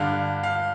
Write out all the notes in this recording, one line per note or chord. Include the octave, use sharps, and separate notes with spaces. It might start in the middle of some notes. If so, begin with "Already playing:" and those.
Already playing: G2 D3 F5
F5